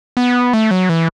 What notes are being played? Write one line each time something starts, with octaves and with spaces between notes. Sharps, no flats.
B3
A3
F#3
E3